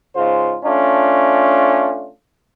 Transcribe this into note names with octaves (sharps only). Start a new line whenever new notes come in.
G#2 C#3 F4 C5
A3 C#4 D4 F4